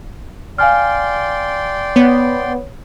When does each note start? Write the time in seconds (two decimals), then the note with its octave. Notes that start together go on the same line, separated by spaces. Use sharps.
0.58 D5 F5 G5 G#5 C6 F6
1.96 B3 C#5